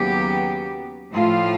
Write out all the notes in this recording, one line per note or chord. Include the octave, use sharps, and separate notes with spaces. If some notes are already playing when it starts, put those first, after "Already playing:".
Already playing: D#2 C#3 F#3 B3 G4
A2 F3 A3 F4